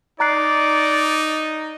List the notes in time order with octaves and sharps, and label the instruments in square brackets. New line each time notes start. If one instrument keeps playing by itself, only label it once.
[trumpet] D#4 [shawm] D5 [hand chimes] A#5 F#6 C7